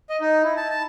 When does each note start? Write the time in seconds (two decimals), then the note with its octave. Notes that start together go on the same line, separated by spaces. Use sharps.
0.10 D#5
0.21 D#4
0.43 E4
0.57 A5
0.70 A5